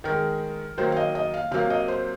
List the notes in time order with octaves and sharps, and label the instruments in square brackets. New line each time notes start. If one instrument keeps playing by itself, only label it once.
[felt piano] D#3 G#3 A#4
D#3 F#3 A#3 C5
F5
D#5
D#5
F5
C3 F#3 A#3 F5
D#5
C5